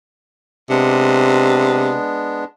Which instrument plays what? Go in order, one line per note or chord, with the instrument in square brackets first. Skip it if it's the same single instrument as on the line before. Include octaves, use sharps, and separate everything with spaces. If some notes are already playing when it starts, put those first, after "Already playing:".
[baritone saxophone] C3 [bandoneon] G#3 B3 D4